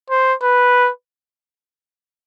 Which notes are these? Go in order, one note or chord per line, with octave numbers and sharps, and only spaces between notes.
C5
B4